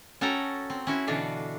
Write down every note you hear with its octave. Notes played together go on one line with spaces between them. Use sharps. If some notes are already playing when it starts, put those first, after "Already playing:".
C#4 F#4 A4 G5 A#5
C4
C#4 E4 F#4
B2 D3 E3 D4 F#4 F5